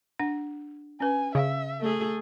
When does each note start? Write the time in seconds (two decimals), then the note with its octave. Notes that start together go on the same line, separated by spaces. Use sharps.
0.19 D4 F#5
1.00 C#4 B4 G#5
1.35 C#3 E5 F5
1.81 A3 G#4